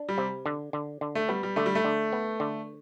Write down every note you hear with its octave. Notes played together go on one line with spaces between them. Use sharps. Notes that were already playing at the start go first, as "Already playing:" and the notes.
Already playing: D4
G3
C3
D3
D3
D3
A3
G3 B3
G3
D3 A3
G3
A3
D3
B3
D3